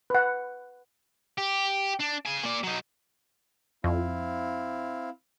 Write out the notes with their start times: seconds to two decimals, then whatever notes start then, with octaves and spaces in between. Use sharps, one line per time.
0.10 B4 F#5
1.38 G4
2.00 D4
2.25 C#3 G#5
2.44 A#3 D5
2.63 F#3 D#4
3.84 F2 C4 E4 F5